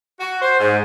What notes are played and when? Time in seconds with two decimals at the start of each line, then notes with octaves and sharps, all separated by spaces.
0.20 F#4
0.42 C5
0.59 G#2